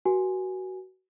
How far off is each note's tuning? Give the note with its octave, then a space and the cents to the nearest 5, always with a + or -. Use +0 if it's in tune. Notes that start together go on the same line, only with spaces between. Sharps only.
F#4 +20 B4 -40 G#5 +0